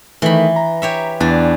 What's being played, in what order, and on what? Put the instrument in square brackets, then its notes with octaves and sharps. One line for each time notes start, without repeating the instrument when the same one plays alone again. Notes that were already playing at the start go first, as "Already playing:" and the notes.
[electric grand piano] D#3 A3 [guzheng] E3 B5
[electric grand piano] A#5
[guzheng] G4 C#5 E5
[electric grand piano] E2 E3 A6 [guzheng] D4